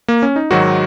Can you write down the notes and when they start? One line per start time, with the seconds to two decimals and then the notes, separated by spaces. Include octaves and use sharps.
0.08 A#3
0.22 C#4
0.36 D#4
0.51 G#2 D#3 F#3 F#4